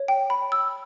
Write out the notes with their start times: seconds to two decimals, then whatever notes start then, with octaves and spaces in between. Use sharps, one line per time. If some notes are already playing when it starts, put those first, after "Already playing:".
Already playing: C#5
0.08 G5
0.30 B5
0.52 E6